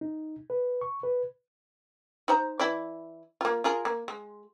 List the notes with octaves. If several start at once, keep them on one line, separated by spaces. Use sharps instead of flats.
D#4
B4
C#6
B4
D#4 C5 A#5
E3 E4 D5
A#3 F4
F4 G#4 A#4
A#3
G#3